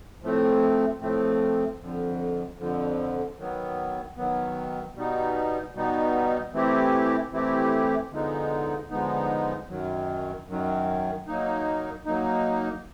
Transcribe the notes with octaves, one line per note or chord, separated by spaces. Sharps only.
A2 F3 A3 C4
A2 F3 A3 C4
F2 D3 F3
F2 D3 F3
D#3 F#3 B3
D#3 F#3 B3
B2 G3 B3 D#4
B2 G3 B3 D#4
E3 A3 C4 E4 G4
E3 A3 C4 E4 G4
D3 F3 G#3 B3 D#4
D3 F3 G#3 B3 D#4
F#2 D#3 F#3
F#2 D#3 F#3
F#3 A#3 D#4
F#3 A#3 D#4